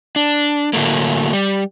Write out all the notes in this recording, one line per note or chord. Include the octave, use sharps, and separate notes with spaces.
D4
A2 D3 F#3 G3 A3 A#3
G3